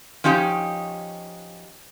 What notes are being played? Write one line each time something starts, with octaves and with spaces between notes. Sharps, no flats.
F3 C#4 D#4 G4